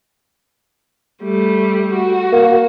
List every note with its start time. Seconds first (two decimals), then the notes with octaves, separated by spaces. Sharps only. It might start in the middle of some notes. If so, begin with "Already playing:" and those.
1.23 G3 A3
1.94 F#4
2.32 A#3